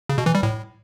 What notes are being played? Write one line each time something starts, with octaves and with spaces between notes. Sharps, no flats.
C#3
B2
E3
G3
A2